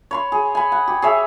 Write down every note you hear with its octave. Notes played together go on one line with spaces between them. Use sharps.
C#5 B5 C6
G#4
G#5 B5
F#5
G4
G#4 C#5 E5